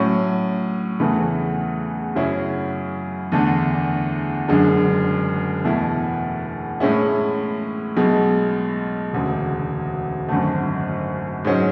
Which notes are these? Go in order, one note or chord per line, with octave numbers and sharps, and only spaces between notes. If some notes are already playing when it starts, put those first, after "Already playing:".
Already playing: A2 F#3 C#4
E2 C#3 E3 A3
F#2 C#3 F#3 C#4 E4
E2 D3 A3 D4
F#1 F#2 D3 G#3 D4
E2 B2 A3 E4
A2 G#3 C#4 E4
B1 B2 G#3
E1 D2 C#3
G#1 F#2 D3 A3
G#2 F#3 C#4